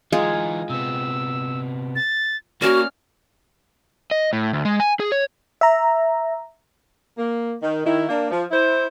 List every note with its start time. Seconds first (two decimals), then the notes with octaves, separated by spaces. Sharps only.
0.12 E3 G#3 D#4 F4 G#4
0.70 C3 B3 E6
1.96 A6
2.62 A#3 C#4 F#4 D5 F6
4.11 D#5
4.33 A2
4.53 D2
4.65 G#3
4.80 G#5
5.00 G#4
5.12 C#5
5.61 E5 A#5
7.17 A#3
7.62 D#3
7.85 D#3 E4
8.09 A#3 D4
8.31 F3
8.51 E4 C5